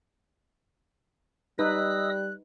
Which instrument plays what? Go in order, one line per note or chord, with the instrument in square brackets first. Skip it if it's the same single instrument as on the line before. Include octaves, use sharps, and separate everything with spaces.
[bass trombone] G3 [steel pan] D#4 B4 [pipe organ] D#5 D#6 E6 [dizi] F#6